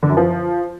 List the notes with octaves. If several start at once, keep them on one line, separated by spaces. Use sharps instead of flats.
D3
F#2
F3